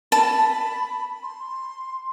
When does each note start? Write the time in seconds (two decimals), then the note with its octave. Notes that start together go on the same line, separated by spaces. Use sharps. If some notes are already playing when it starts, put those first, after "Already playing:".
0.12 A5 B5
1.23 C6